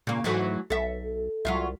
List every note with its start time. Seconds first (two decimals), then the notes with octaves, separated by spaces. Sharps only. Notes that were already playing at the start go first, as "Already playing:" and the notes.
0.07 A#2 C#3 A#3
0.24 G#2 E3 F#3 A3
0.70 B1 A4 E5
1.45 C2 F#3 F4 E5